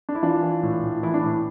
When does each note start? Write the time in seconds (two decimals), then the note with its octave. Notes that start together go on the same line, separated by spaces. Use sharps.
0.09 D4
0.15 E4
0.23 E3 D4 F4
0.43 E3
0.63 A2
0.83 A2
1.03 E3 E4
1.14 D4
1.23 A2 E4